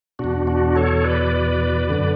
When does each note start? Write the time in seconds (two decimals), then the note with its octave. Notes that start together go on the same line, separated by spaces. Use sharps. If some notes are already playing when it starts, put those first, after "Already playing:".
0.19 E2 B2 D4 F#4
0.47 D4 F#4
0.76 A4 C#5
1.04 B4 D5
1.89 F#2 D3